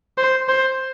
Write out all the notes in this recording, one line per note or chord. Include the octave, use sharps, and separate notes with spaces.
C5
C5